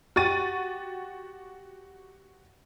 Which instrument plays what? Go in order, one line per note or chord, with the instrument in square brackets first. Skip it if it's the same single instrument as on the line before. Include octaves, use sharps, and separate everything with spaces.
[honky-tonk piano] F#4 G4 C#6 A6 D#7